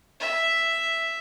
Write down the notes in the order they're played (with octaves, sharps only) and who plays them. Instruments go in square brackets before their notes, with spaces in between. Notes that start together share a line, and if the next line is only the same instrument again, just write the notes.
[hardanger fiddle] E5